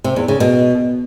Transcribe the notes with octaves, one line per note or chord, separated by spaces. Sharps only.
C3
E2
C#3
B2